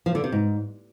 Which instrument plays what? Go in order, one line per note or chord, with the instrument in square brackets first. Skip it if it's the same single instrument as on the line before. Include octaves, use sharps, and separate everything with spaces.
[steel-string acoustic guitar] F3
D3
C3
G#2